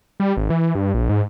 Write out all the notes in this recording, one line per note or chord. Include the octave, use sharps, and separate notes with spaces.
G3
G#1
E3
G2
A#1
G#2